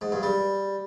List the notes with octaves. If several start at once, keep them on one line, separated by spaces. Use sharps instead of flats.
G#2
G2
G3